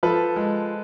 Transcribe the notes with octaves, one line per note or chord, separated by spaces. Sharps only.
F3 A4 B4
G#3